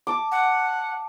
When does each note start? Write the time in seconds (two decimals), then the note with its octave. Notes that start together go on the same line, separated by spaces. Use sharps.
0.07 A5 D6
0.32 F#5